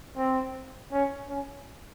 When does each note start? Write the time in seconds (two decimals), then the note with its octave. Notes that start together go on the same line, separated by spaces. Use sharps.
0.17 C4
0.92 C#4
1.29 C#4